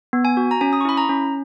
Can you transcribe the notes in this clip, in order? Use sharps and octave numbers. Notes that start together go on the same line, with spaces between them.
B3
G#5
F#4
A#5
C#4 G#5
D#6
C#6
E4 B5
A#5
C#4